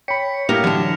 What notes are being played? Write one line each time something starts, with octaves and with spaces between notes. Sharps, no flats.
C#5 G5 B5 B6 C#7
A2 F#3 A#3 E4 G4 F6 A#6 F7
D3 E3 F#3 A5